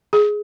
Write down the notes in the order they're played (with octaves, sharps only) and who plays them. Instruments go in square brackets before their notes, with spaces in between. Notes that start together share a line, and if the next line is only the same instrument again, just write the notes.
[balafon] G#4